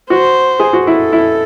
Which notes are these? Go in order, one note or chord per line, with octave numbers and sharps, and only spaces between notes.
F#4 C5
G#4
F#4
E4 A4
E4